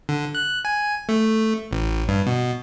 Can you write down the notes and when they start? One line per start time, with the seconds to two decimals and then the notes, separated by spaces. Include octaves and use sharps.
0.09 D3
0.35 F#6
0.65 G#5
1.09 A3
1.71 A1
2.08 G2
2.27 B2